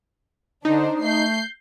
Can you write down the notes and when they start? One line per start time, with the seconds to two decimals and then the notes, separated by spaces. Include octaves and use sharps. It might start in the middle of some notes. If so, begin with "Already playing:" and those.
0.65 D3 D4 D#4 C5
1.02 A3 G6 C7